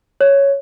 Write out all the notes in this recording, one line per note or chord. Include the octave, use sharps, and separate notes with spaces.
C#5